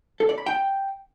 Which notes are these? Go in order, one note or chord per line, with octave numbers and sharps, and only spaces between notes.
A4
D5
B5
G5